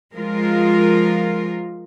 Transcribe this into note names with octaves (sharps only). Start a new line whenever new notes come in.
F3 G#3 F4 A#4